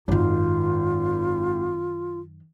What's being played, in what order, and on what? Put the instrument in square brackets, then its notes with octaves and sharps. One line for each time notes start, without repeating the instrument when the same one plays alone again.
[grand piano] G#1 [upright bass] F#2 D#3 [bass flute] F4